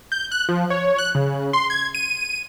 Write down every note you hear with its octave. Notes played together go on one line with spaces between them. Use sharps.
G6
F#6
F3
C#5
F#6
C#3
C6
G#6
D#7